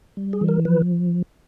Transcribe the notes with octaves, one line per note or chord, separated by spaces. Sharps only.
G3
G#4
E3
A#4
F3 B4